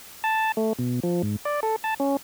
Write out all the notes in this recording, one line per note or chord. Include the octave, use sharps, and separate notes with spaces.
A5
A3
B2
F3
G#2
D5
A4
A5
C#4